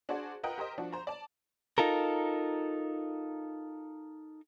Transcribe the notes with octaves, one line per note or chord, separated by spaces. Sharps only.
D4 F#4 G#4 C5 D5
F4 A#4 B4 D#5 F#5 G5
G4 A#4 C5 D#5
F3 D4 F#4
C5 A#5
D5 A5
D#4 F4 A4 A#4